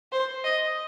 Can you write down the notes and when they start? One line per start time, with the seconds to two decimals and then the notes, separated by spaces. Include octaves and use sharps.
0.12 C5
0.44 D#5